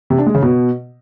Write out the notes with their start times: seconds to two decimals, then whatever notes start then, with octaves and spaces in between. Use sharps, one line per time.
0.10 C3
0.18 D4
0.26 G#3
0.35 C#3
0.43 B2